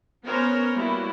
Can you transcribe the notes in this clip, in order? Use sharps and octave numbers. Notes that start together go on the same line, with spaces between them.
B3 C#4 A#4 C5 C#5
G3 A#3 B3 E4 F#4